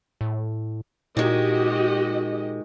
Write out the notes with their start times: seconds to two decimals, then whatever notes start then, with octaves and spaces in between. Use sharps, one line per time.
0.21 A2
1.17 A#2 D#3 G#3 F#4 G4 D#5